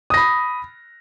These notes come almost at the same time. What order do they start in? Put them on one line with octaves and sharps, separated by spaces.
D#6 A#6 B5